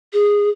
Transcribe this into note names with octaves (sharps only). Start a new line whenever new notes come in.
G#4